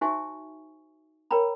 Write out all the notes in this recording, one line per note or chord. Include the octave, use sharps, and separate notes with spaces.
D#4 F#4 C5 E5 G#5 C#6
A#4 C#5 G5 A#5 B5